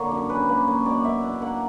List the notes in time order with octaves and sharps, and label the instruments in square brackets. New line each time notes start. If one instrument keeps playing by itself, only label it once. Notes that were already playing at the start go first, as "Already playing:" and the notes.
Already playing: [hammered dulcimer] D3 A#3 C#5
F#2
C#4 B4
A#3 B4
A#3 C#5
B2 C#5 D5
B2 E5
D4
A#3 F#5